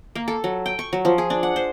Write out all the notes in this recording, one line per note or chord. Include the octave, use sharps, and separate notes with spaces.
A#3
A4
F#3
G5
C#6
F#3
F3
G#4
D4
F#5
C5